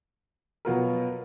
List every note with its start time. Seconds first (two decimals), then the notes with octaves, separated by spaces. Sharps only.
0.65 B2 F#3 B3 F4 A#4